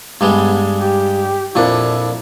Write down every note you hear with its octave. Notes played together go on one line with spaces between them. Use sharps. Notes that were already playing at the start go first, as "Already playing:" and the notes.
G2 G3 G#3 B3
G4
F2 A#2 D4 E4